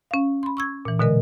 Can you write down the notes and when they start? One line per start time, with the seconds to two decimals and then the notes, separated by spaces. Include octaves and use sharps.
0.11 C#4 F5
0.43 B5 C6
0.57 C#6 E6 G#6
0.85 A#2 E3
0.99 B2 D3 G#3 A#4 D#5